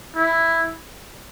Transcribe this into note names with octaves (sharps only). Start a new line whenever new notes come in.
E4